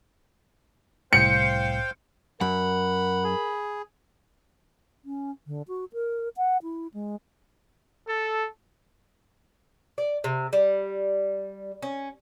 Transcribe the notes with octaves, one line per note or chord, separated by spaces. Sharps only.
C2 A2 C5 F5 G5 C#7
F#2 A#4 F#5 B5
G#4
C#4
D3
F#4
A#4
F#5
E4
G#3
A4
D5
C3
G3
C#4